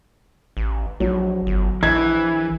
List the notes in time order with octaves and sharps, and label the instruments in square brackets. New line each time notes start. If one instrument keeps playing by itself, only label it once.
[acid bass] A1
[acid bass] A#1 [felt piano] F#3
[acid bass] G1
[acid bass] A#1 [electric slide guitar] E3 [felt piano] G#6